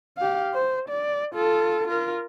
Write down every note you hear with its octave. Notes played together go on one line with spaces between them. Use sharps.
G4 F5
C5
D5
F4 A4
F4 A#4